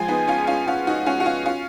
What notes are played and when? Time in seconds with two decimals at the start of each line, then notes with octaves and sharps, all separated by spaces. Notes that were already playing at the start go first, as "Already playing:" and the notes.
Already playing: F3 G#3 G#5
0.08 B3 D#4
0.28 C#4 F4
0.47 C#4 F4
0.67 C#4 F4 F#5
0.87 D#4 F#4
1.06 C#4 F4
1.20 F#4
1.26 C#4 F4
1.46 C#4 F4